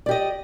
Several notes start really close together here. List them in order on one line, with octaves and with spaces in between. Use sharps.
D5 G4 D#5